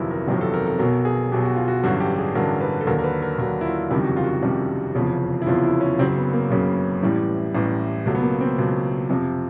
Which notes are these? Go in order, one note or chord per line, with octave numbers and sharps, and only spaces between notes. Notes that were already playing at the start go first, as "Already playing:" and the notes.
Already playing: G1 F2 C3 D#3 F#3 E4
A#4
G1 F2 C3 D#3 F#3
A4
A#4
A4
B1 B2 F#3 A#4
G#4
B1 B2 F#3 G4
F#4
F4
F#4
A1 G2 D3 F#3 F#4
G4
G#4
A1 G2 D3 F#3 A#4
B4
A4
D#2 D3 F#3 A#4
A#4
B4
A#4
D#2 D3 F#3 A#4
E4
F4
F#1 F2 C3 D#3 G3 E4
F#4
F4
F#4
F4
F#1 F2 C3 D#3 G3
F1 E2 C#3 F3
E4
F1 E2 C#3 F3 F4
E4
C#4
F#1 F#2 C#3 F#3 C4
B3
A#3
F#1 F#2 C#3 F#3
A1 A2 E3 G3
A1 A2 E3 G3
C#2 B2 F#3 A3
B3
A#3
C4
C#2 B2 F#3
F2 C3 F3